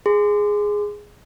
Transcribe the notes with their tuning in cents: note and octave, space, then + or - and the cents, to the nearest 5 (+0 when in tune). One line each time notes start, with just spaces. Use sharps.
G#4 +0 C6 -25